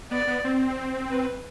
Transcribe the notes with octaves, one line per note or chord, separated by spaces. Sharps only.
B3 D5
B3
C4
B4